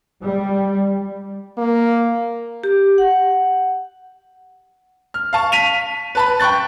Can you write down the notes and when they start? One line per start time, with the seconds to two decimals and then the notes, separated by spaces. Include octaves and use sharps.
0.23 G3
1.58 A#3
2.64 G4
2.98 F#5
5.14 F6
5.33 F5 A5 C#6
5.52 B6 D#7 F7
6.15 B4 A5 B5
6.40 G5 A5 C#6 F#6 A6